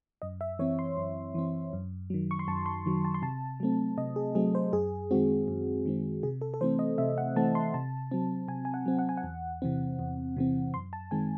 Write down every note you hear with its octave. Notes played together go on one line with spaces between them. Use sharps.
F#2 D#5
E5
E3 C4 C#5
C6
F#2
E3 C4
F#2
D#3 F#3
C#6
C6
F#2 A5
C6
D#3 F#3
A5
C6
C3 A5
F#3 A3 C4
C3 D#5
G#4
F#3 A3 C4 G#4
C5
F#2 G#4
D#3 G#3 C4 F#4
F#2
D#3 G#3 C4
C3 G#4
A4
A4
E3 A3 C4 C5
D#5
C3 E5
F#5
E3 A3 C4 A5
C6
C3 A5
F#3 C4
C3 G#5
G#5
F#5
F#3 C4
F#5
G#5
F#5
E2
C3 E3 C4
E2
C3 E3 C4
F#2 C6
A5
D#3 G#3 C4 G#5